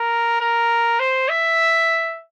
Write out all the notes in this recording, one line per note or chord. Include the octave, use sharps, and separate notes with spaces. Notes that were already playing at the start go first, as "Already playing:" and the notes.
Already playing: A#4
A#4
C5
E5